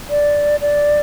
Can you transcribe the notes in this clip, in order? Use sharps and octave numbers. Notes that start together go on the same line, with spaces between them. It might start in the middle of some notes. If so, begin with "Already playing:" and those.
D5
D5